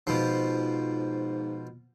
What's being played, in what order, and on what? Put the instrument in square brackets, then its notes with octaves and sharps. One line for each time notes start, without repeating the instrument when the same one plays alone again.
[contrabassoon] G#2 [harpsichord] B2 F3